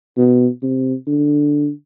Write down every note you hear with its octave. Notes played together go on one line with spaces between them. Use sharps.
B2
C3
D3